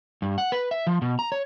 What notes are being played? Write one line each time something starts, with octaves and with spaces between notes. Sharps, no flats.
G2
F#5
B4
E5
F3
B2
A#5
C#5